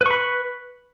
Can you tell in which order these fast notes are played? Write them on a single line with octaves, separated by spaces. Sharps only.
B4 C#6 B5